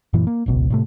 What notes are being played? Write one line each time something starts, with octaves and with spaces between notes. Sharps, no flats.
F#2 A#2 E3
A#3
D1 G#1 C#2 B2
A2 C3 A3